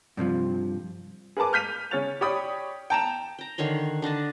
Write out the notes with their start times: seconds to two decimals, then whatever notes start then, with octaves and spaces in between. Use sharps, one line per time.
0.17 G2 C3 D#3 F3
1.37 G#4 A#4 B4 A5 D6
1.53 F6 G6 B6 D#7 F7
1.91 C#3 G#4 C#5 F6 A6 F7
2.21 G4 C#5 D5 G5 B5 D#6
2.90 G5 A5 A#5 E7
3.39 G5 A#5
3.58 D3 D#3 C#5 C6
4.02 D3 D4 D#5 A5